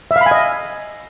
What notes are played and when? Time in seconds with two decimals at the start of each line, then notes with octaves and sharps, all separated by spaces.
0.11 E5
0.16 F5
0.21 B5
0.26 G#5
0.31 D#5